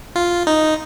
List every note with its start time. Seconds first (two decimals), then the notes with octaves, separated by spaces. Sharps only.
0.16 F4
0.47 D#4